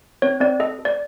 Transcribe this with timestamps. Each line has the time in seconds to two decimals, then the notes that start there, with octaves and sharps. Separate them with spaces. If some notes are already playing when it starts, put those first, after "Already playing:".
0.22 C4 C#5
0.40 C4 D5
0.60 A4 D#5
0.79 A4
0.85 D5